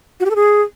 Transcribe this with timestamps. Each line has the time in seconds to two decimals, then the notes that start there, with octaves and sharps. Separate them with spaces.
0.20 F#4
0.25 G4
0.30 A4
0.36 G#4